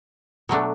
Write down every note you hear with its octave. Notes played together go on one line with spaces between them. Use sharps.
B2 F#3 A3 D4